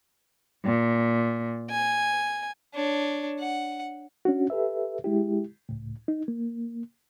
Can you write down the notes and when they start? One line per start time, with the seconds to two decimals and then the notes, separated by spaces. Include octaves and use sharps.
0.64 A#2
1.70 G#5
2.74 D4 C#5
3.39 F#5
4.25 C#4 D4 F#4
4.50 G4 A4 B4 E5
5.04 G#3 E4 G4
5.69 C#2 A2
6.08 D#4
6.28 A#3